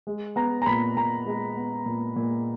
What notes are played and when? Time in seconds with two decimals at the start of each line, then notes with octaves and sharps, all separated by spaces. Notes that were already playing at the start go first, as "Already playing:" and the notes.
0.07 G#3
0.36 B3 A#5
0.62 A#5
0.66 A#2 B5
0.96 A#2 A#5
1.26 G#3
1.57 B3
1.86 A#2
2.16 A#2